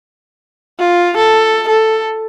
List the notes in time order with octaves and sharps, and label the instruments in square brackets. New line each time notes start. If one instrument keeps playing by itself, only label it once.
[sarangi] F4
A4
A4